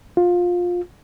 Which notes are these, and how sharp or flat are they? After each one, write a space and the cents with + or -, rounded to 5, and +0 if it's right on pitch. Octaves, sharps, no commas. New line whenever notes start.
F4 +20